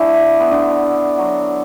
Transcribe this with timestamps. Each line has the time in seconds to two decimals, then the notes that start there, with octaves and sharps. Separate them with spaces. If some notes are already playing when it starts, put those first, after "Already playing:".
Already playing: E3 A3 D4 E4 A4
0.40 B3
0.51 D3 D4
1.18 F#3 F#4